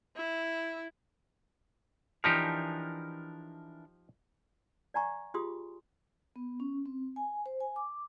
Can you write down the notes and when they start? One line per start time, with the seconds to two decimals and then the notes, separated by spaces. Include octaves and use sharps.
0.16 E4
2.24 E3 F3 D4 D#4 G4 A#4
4.94 D5 F#5 G#5 A#5 C#6
5.34 F4 G4 G#4 C6 D#6
6.36 B3
6.60 C#4
6.86 C4
7.16 G#5
7.46 C5
7.60 G#5
7.76 D6